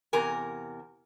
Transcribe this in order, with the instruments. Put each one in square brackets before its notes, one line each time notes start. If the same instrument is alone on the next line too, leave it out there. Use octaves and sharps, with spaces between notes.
[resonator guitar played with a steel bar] E2 C3 A#4 G#5